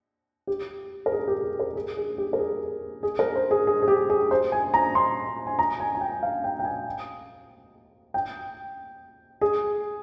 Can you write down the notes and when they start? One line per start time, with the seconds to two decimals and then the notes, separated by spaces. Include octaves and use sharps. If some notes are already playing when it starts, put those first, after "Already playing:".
0.47 G4
1.06 A#4
1.12 G#4
1.28 G4
1.44 G#4
1.60 A#4
1.76 G#4
1.97 G#4
2.18 G4
2.33 A#4
2.39 G#4
3.03 G#4
3.19 A#4
3.36 C5
3.51 G#4
3.67 G#4
3.82 G#4
3.88 G4
4.10 G#4
4.31 C5
4.52 G#5
4.74 A#5
4.95 C6
5.47 G#5
5.59 A#5
5.80 G#5
5.95 G#5
6.01 G5
6.23 F5
6.44 G5
6.59 G5
6.65 G#5
8.14 G5
9.41 G#4